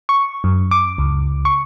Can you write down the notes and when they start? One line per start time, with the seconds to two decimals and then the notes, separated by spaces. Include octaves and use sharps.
0.09 C#6
0.44 F#2
0.71 D6
0.98 C#2
1.45 C#6